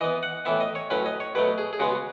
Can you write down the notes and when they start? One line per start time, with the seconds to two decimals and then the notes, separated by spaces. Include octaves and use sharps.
0.01 E3 B3 D#5
0.23 F#5
0.45 A2 E3 B3 E5
0.60 D#5
0.75 C#5
0.90 A2 F#3 C#4 B4
1.06 D#5
1.20 C#5
1.35 B2 F#3 A3 B4
1.58 G#4
1.73 G#4
1.80 C#3 G#3 B3 F#4